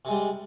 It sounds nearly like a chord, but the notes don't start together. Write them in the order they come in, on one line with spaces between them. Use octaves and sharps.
C3 G#3 G3